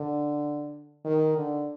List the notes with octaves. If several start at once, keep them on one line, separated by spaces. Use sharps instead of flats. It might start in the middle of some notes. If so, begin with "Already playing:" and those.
Already playing: D3
D#3
D3